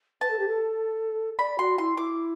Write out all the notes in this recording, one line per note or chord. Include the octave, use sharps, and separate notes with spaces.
B4 A5
A4
G4
A4
D5 B5
F#4 C6
E4 C6
E4 D6